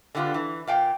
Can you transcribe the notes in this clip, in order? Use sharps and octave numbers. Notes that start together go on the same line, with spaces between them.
D3 G3 B3 E4 F4
E3
A#2 F5 G5